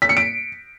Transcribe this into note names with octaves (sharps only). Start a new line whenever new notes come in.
B6
C#7
D7